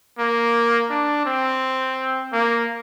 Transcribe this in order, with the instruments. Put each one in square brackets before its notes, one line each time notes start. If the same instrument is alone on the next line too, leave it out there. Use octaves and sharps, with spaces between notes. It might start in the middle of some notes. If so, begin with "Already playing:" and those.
[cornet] A#3
D4
C4
A#3